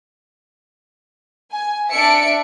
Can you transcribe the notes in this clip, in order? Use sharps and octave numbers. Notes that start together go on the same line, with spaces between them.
G#5
D4 E5 C#7 D7